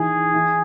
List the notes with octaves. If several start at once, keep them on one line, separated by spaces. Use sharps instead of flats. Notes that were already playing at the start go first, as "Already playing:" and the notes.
Already playing: D#3 E3 G#4
E3